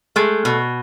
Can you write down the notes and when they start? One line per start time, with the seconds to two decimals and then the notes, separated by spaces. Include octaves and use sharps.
0.16 G#3 A3
0.45 B2